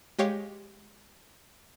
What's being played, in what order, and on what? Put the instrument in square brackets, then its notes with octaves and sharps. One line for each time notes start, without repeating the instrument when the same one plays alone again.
[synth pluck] G#3 G4 C#5 F5